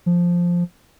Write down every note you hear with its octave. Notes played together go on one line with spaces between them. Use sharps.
F3